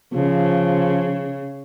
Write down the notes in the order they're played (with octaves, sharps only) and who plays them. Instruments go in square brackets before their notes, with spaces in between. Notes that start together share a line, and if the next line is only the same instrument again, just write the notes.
[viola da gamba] C#3 [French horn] F3